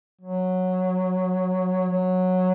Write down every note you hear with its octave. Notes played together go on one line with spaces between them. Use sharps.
F#3
F#3